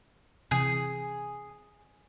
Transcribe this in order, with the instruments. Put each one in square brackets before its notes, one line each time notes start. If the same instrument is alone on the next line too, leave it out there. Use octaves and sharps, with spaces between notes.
[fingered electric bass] C3 E3 [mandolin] G#4